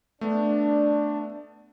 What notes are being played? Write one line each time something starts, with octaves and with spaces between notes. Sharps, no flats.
A3 B3 D4